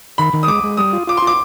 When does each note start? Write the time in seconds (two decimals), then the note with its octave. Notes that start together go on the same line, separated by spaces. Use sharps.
0.18 D#3 B5
0.33 D#3
0.43 D#6
0.48 G#3 D6
0.64 G#3
0.77 G3 D#6
0.93 F4
1.07 F4 D6
1.17 C6
1.22 F4 D6